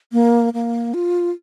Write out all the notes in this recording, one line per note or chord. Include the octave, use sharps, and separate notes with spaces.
A#3
A#3
F4